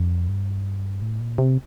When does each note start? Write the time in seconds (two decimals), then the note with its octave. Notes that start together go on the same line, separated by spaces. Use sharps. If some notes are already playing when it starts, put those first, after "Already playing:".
Already playing: F2
0.29 G2
1.02 A2
1.20 A#2
1.38 C3